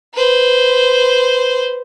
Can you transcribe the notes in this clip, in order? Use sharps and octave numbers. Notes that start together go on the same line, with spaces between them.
B4 C5